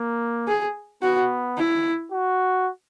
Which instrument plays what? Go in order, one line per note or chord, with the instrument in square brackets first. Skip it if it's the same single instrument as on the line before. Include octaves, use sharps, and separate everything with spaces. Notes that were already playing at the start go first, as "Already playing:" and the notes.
Already playing: [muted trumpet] A#3
[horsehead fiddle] G#4
[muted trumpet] B3 [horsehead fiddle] F#4
[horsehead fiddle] E4
[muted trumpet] F#4